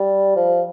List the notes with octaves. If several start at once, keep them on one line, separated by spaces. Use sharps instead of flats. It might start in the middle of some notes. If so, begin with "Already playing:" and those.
Already playing: G3
F3